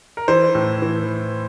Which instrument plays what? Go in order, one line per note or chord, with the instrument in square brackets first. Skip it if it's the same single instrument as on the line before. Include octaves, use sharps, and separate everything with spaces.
[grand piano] A#4
E3 C5
A2
E3